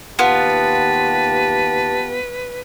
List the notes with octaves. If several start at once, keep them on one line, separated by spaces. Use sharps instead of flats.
D#2 B3 F4 G4 B4 A5